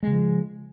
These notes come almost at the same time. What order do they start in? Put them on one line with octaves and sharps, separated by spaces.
G#3 C#3 F3